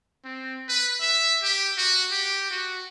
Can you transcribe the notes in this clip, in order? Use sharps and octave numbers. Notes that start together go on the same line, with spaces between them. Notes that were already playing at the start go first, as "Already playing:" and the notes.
C4
B4
E5
G4
F#4
G4
F#4